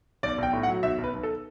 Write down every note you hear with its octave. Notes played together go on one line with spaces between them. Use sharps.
B1 D5
B1 G5
A2
F#5
F#3
B1 E5
B1
B4
B1
A4